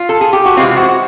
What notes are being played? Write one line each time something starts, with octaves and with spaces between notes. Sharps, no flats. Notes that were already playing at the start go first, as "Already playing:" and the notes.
Already playing: F4
A4
G#4
G4
F#4
C3 E3 G#3 C4 F4
F#4